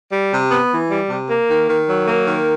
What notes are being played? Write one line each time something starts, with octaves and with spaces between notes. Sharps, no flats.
G3
C3
B3
E3
G3
C3
A#3
D#3
D#3
F#3
A#3
D#3